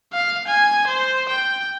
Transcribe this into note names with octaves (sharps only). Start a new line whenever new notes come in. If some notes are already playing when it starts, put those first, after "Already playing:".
F5
G#5
C5
G5